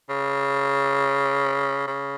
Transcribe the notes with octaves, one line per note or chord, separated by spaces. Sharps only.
C#3
C#3